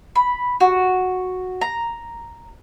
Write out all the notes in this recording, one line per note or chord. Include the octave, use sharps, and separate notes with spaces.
B5
F#4
A#5